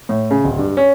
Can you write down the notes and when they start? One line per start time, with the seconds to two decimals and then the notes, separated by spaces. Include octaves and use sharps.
0.09 A2
0.31 C#3
0.44 D1
0.58 G2
0.77 C#4